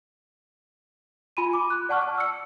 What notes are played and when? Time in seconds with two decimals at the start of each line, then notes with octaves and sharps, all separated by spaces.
1.37 F4 G#5 B5 C6 D#7
1.53 D6
1.70 F#6
1.89 D5 F#5 A5 C#6 F6
2.02 A5
2.18 E6 C#7